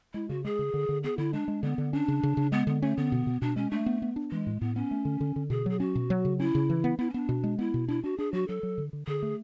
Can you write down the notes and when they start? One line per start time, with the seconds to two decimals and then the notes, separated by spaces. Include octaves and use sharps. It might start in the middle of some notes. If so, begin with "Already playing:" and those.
0.14 G#3 E4
0.29 C#3 F#4
0.44 G#3 G#4
0.59 C#3
0.74 D3
0.89 D3
1.04 B3 G#4
1.18 D3 E4
1.33 G#3 D4
1.48 G#3
1.63 D3 B3
1.78 D3
1.93 C#4 D4
2.08 C#3
2.23 C#3
2.37 C#3
2.52 G#3 B3
2.67 D3 B3
2.82 A3 C#4
2.97 D3 B3
3.12 B2
3.27 B2
3.42 B2 D4
3.56 G#3 C#4
3.71 A3 D4
3.86 B3
4.02 B3
4.16 D4
4.32 E3 G#3
4.47 A2
4.61 A2 B3
4.76 B3 C#4
4.91 A3
5.05 D3
5.20 D3
5.36 D3
5.50 B2 G#4
5.66 F#3 G#4
5.80 C#4 F#4
5.95 B2
6.10 F#3
6.25 C#3
6.40 C#4 E4
6.55 C#3
6.69 E3
6.84 B3
6.99 B3 E4
7.10 C#4
7.14 B3 D4
7.29 B2
7.44 G#3
7.59 B3 E4
7.74 B2
7.88 D4 E4
8.04 D4 F#4
8.18 D4 G#4
8.33 F#3 F#4
8.48 F#3 A4
8.63 F#3
8.78 D3
8.93 D3
9.07 D3 G#4
9.22 A3